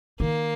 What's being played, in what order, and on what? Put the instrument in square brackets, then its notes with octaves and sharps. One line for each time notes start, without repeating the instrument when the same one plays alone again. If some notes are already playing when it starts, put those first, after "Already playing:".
[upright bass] D#3 [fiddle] A#3